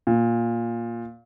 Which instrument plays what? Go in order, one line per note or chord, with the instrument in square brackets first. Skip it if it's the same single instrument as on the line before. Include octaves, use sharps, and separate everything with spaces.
[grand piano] A#2